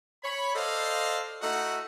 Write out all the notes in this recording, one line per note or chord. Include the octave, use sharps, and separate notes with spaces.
C#5 B5
A4 C5 D5 D#5 F5
A3 D#4 E4 F#4 F#5